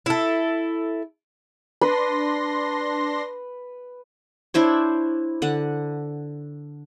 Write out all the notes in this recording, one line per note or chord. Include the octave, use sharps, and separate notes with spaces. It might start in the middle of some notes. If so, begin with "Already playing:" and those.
E4 A4
D4 B4 C6 A#6
D4 E4 C5 C#5
D3 F#5